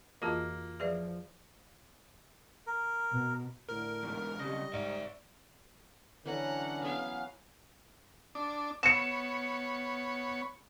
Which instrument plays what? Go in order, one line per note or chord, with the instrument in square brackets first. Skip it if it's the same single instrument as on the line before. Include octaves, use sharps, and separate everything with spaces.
[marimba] F2 E3 D#5 [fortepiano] A#3 [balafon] F4 F#4 G#4
[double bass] F3 [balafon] G#4 B4 D5 [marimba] E5
[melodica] A#4
[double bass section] B2
[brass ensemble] A2 D3 [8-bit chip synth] A#4
[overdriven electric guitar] E2 G#2
[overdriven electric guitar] B1 C#3 [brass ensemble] G3 [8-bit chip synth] D#5
[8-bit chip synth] G#2 [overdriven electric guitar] D5 E5
[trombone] D3 [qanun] E3 [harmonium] F#3 C#4 B4 [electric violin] F#5 A#5
[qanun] B3 [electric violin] F5
[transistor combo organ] D4
[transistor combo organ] B3 C#5 [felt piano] C#7 E7